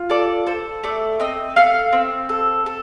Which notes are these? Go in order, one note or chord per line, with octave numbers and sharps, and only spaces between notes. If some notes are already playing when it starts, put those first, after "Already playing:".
Already playing: F4
A4 D5
A4 C5
A3 D5
C4 D#5
A3 F5
C4
A4
A4